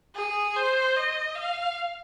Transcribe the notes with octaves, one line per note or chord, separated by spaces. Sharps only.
G#4
C5
D#5
F5